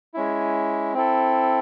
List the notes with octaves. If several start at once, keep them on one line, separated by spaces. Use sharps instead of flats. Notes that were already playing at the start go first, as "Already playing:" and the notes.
G#3 C#4 E4
C4 E4 A4